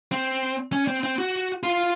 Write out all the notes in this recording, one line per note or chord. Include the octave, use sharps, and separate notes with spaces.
C4
C#4
C4
C4
F#4
F4